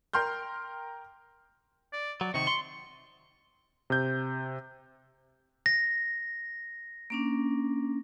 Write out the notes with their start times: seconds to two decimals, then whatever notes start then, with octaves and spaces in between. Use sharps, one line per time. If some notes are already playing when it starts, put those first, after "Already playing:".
0.13 A#4 G5 C6 F6 G6
1.93 D5
2.21 F#3 D5
2.34 C3 D#3 C#6
2.47 C6
3.90 C3 G6
5.66 A#6
7.10 A#3 C#4 D4